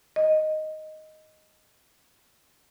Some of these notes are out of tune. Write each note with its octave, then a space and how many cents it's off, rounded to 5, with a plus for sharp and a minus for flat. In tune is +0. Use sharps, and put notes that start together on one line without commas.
D#5 +0